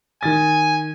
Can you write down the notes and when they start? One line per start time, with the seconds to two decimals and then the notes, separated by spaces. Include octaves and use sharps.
0.23 D#3 G#5 A6